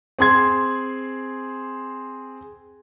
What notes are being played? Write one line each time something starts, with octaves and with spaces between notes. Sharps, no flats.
C4 G#4 C6 G#6